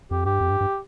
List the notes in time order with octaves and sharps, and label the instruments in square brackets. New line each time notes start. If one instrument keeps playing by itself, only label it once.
[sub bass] F2 [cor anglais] G4
[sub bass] G2 [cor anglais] G4
[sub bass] F2
G2
G2